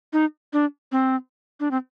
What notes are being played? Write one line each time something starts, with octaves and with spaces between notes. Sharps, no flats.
D#4
D4
C4
D4
C4